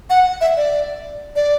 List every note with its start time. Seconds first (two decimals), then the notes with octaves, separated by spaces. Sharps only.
0.10 F#5
0.41 E5
0.57 D5
1.36 D5